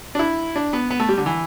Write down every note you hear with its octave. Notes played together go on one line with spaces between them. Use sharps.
D4
E4
D4
B3
B3
A3
G3
D3
E3